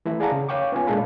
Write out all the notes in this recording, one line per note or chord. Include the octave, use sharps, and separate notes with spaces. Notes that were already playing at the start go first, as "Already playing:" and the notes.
E3 A3 E4
G#4 D5 F5 F#5 A5 A#5
C#3
C#5 F5 G5 C#6 D6
B3 C#4 F4 G#5
A#2 G#3 D4 A4 F5 B5